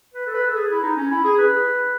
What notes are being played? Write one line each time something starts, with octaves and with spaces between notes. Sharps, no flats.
B4
A4
B4
A4
G#4
E4
D#4
C#4
E4
G#4
B4